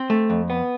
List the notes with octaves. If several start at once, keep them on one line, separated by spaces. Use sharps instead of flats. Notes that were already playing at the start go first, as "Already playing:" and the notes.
Already playing: C4 C5
A3
F2
B3